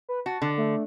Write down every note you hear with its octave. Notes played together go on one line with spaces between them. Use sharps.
B4
F#4 A5
D3
A3